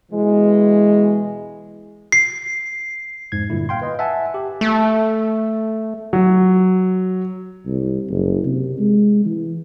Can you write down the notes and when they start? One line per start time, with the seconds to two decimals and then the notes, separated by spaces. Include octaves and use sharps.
0.12 B2 E3 G#3
2.12 C7
3.32 F2 G#2 G#6
3.50 G2 A#2 D3 E4
3.69 F5 G5 C6
3.82 B4 D#5
3.99 E5 F#5 G#5 A5
4.34 G4
4.61 A3
6.13 F#3
7.66 C2
8.09 F#1
8.45 C3
8.80 G#3
9.26 E3